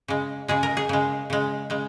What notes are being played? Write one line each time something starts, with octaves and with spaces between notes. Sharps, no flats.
C#3 G#3
C#3 G#3 G#4
A#4
G#4
C#3 G#3
C#3 G#3
C#3 G#3